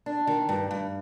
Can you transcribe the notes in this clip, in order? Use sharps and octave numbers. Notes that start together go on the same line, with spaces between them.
D4
D#3
G2
G2